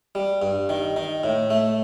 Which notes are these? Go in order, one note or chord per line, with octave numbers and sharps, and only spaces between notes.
G3
G2
D#3
D#3
A2
A3